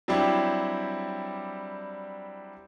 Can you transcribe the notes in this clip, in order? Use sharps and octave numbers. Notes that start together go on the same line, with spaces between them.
F#3 G3 C4 D4 E4 G4